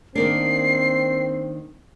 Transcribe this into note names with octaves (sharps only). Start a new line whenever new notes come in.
D#3 A#3 C4 D4 C7